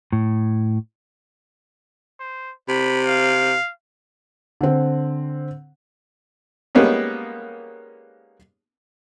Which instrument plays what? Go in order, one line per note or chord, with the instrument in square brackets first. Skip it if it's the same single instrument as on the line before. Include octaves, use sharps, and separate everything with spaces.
[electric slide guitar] A2
[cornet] C5
[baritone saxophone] C3 [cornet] B5
[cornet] F5
[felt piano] D3 C4
[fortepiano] G3 G#3 A#3 B3 C#4 D#4